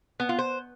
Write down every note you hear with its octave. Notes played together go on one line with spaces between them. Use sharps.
B3
F4
C5